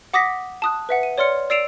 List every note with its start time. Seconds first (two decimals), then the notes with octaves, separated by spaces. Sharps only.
0.14 F#5 D6 D#6 A#6 B6
0.62 A5 D#6 F#6
0.89 B4 E5 F#5
1.03 D#7
1.18 C#5 D5 C6 F6 C#7
1.50 D5 E6 C7 D7 E7 F7